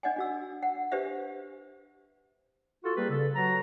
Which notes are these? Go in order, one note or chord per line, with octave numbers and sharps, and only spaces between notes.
D4 D#5 F#5 G#5
D4 F#4 E6
F#5
D4 G4 B4 C5 E5 F5
F4 F#4 A4
G3 A#3 C4 G4 G#4 B4
C#3 A4
F#3 F#4 A4 B4 A#5